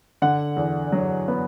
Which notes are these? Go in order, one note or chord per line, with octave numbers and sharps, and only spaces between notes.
D3 F#5
E2
F#3
B3